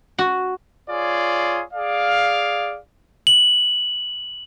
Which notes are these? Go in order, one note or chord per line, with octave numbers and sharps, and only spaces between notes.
F#4
F4 G#4 C#5 D5
G#4 D5 F5
F#7